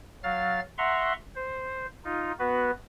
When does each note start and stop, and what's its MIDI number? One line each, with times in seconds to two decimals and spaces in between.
0.23 0.60 54
0.23 0.60 77
0.23 0.60 89
0.23 0.60 93
0.78 1.13 76
0.78 1.13 78
0.78 1.13 82
0.78 1.13 84
0.78 1.13 85
1.36 1.86 72
2.04 2.32 63
2.04 2.32 65
2.39 2.71 59
2.39 2.71 66
2.39 2.71 71